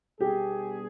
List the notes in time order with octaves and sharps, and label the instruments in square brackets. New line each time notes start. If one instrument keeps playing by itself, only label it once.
[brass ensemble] B2 G3 B3 D4 G#4 [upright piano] G4